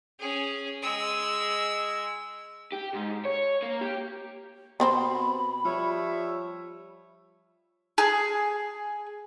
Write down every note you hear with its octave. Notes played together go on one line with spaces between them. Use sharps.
C#4 G#4
G#3 E6
G4
G#2
C#5
A#3
G4
B2 B3 C4 C5 B5
F3 G3 C#5 E5
G#4